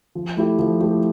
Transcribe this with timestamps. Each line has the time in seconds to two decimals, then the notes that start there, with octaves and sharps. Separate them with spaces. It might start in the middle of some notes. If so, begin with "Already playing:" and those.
0.15 F3
0.37 A3 E4 G4
0.59 F3
0.81 A3 E4 G4